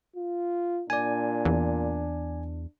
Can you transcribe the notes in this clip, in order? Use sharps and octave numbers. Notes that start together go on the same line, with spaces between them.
F4
A#2 D4 D5 G#5
E2